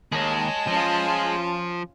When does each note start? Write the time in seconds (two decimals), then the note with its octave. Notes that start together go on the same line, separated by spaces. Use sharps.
0.12 D#2 G#4 C#5 D#5 A5
0.67 F3 C#4 F4